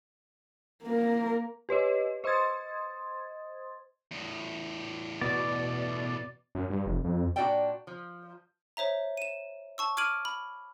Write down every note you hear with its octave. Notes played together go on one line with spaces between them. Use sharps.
A#3 A#4
G4 B4 C#5 D#5
C5 D#5 C6 D#6 G#6 A6
E2 A2
B2 B3 D5
F#2
G2
F1
F2
A#2 D4 F#4 D5 E5 G5
F3
C5 C#5 E5 A#5
D#7 E7
A5 C#6 E6
D6 F6 G#6 D7 D#7 F#7
B5